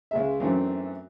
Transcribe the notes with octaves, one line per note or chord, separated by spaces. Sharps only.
C#2 G#3 E5
F#2 E3 A3 C4 D4 F#4